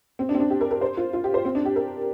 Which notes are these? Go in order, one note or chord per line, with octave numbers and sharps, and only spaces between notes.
C4
D4
C4
D4
G4
A#4
A#4
C5
F4
F4
G4
C5
C4
D4
G4
A#4